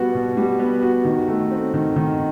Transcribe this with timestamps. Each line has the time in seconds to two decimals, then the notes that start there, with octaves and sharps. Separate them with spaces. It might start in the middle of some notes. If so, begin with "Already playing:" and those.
Already playing: B2 G3 B3 F#4
0.15 B2
0.37 G3
0.60 B3
0.83 F#4
1.05 D#3
1.28 A3
1.51 C4
1.74 D#3
1.96 D#3